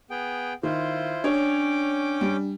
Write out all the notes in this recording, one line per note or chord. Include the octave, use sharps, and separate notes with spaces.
B3 G#4 G5
D#3 E4 F4 C5
C#4 D4 C#5 G5 D6
G3